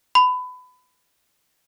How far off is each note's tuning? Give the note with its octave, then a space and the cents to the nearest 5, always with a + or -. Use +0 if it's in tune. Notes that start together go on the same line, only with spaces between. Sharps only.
B5 +25